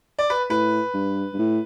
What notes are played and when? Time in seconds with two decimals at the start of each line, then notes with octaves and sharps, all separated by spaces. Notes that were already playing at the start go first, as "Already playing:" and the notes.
0.19 D5
0.30 B4
0.50 A2 B4
0.94 G2
1.33 G2
1.39 A2